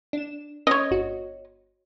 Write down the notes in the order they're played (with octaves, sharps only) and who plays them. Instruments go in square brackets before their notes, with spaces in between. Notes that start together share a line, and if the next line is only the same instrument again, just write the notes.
[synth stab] D4 E7
[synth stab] C#4 [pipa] C#5 D#5
[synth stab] G1 F#4